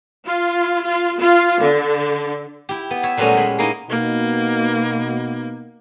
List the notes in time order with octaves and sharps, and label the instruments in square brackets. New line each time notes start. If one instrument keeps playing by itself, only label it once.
[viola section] F4
F4
F4
D3
[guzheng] E4 G4
B3
C#5 E5
A#2 F#3 G3 A3 B3 C#4
A#2 G#3 B5
A#3 C#4 D#4 E4 D#5
[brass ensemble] B2 B3 D#4 [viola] A#3